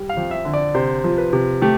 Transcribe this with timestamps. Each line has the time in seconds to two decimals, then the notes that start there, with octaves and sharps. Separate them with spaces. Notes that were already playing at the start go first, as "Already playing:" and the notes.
Already playing: G3
0.09 F5
0.17 F2
0.31 E5
0.45 D3
0.53 D5
0.74 C3 C5
1.04 F3
1.18 B4
1.33 C3
1.62 A3 G4